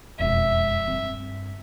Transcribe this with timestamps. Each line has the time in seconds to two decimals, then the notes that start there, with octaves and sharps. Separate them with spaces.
0.19 E1 F2 E5
0.87 G2 C4